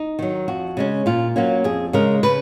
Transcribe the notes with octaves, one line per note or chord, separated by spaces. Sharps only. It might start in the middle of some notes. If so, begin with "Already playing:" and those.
Already playing: D#4
D#3 F#3
F2 F#4
C#3 G#3 C#4
A#2 F4
F#3 A#3 C#4 F4
F2 G#4
C#3 G#3 A#4
C#3 B4